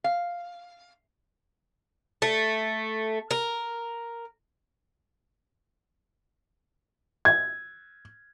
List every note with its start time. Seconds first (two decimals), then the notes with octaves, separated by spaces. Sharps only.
0.04 F5
2.22 A3
3.31 A#4
7.25 G#6